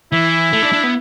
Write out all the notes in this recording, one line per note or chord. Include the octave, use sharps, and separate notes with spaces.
E3 E4
A3
D4
D4
B3